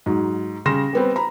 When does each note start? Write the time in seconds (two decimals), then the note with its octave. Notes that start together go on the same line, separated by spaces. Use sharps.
0.06 G#2 F#3
0.66 C#3 G3 C6 A#6 E7
0.93 G3 B3 C4
1.16 A#5 B5